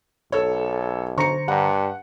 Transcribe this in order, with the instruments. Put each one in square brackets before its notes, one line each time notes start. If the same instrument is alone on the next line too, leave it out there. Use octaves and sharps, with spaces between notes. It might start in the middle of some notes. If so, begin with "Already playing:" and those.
[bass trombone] B1 [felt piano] A4 C#5
[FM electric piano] D3 C5 A#5 [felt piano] C#6 C#7
[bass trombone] G2 [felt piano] F#5